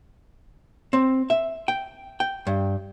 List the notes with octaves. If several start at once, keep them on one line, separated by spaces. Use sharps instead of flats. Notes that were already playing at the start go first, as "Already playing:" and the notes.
C4
E5
G5
G5
G2